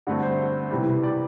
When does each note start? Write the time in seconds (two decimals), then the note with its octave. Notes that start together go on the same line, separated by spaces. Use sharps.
0.07 G2 D3 A3 C4 F#4
0.23 C5
0.71 C3 E3 G3
1.03 D5